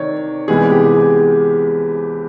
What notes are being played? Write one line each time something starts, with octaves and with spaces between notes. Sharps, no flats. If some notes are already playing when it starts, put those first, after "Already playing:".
Already playing: C3 D#3 C#5 D5
C2 C3 E3 G#3 B3 G#4
G4
G#4